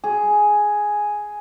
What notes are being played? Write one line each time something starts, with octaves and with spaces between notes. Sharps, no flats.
G#4